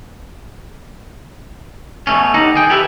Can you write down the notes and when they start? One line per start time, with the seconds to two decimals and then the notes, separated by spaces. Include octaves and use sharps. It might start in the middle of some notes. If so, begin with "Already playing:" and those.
2.07 B2 A3 C#4
2.34 G3 D#4 F#5 A#5
2.54 D#3 G#4 G5
2.70 E4 G4 A4 B4 E5